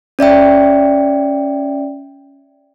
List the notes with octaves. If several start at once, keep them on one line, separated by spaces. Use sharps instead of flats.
C#4 D5 E5 G5